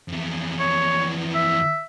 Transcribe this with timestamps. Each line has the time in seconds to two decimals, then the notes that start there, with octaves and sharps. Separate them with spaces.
0.09 F2 E3
0.59 C#5
1.35 E5